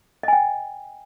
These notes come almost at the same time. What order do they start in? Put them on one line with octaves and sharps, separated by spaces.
D#5 G#5 G5